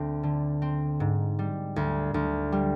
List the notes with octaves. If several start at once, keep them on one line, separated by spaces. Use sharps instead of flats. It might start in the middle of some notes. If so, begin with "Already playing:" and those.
Already playing: D2 C4
D3
C4
G#2
G3
D2
D2
G3